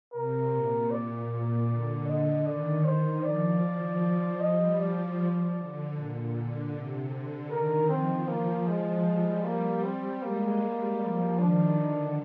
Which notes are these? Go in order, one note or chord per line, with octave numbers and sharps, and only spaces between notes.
C3 A#4
A#2
D5
A#2
D3
D#5
D#3 D5
D#3 C5
F3 D5
F3
G3 D#5
F3 D5
D3
A#2
D3
C3
D3
D#3 A#4
F3 C4
A#3
G#3
G3
A#3
C4
G#3 A#3
G3
F3
D#3 D4
D3